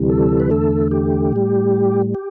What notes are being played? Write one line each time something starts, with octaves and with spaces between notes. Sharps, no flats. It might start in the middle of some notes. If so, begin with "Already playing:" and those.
Already playing: D2 C3 E3 G3
A4
B4
E2 D3 A3 A4
G4
A2 G3
G4